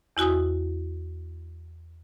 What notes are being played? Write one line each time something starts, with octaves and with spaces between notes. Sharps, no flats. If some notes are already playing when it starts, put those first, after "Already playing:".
E2 E4 F#4 G#5 D#6